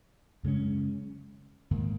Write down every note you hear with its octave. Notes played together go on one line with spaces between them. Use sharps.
F#2 C#3 G#3 C#4
G#2 D#3 A#3